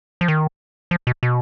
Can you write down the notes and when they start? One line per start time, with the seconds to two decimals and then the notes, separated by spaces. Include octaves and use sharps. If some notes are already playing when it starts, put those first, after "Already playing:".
0.21 F3
0.28 D#3
0.91 F3
1.07 B2
1.23 B2